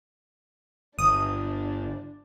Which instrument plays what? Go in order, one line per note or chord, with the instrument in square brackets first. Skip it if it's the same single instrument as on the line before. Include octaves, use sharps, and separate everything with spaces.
[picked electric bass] G1 [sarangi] D4 [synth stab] D#6